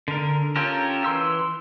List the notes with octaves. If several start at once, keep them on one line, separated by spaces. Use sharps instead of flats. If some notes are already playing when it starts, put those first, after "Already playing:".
D3 A#4
C#4 F4 G4 A4 A#4
E3 C6 E6